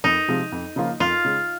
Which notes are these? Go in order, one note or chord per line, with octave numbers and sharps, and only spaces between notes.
F2 D#4
C3 F3 G#3
F2
C#3 F3 A#3 F4
F2 F4
C#3 G#3